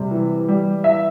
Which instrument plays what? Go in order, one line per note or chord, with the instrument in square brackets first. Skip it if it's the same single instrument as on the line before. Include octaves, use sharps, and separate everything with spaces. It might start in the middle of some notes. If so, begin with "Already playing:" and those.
Already playing: [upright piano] C3 G3
E3
G3
E3 E5